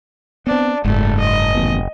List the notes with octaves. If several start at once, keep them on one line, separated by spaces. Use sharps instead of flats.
B3 C4 D4
F#1 G#2 A3
D#5
D#1 A1 B3